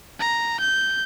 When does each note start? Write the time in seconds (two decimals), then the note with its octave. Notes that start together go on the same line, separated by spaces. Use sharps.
0.20 A#5
0.60 G6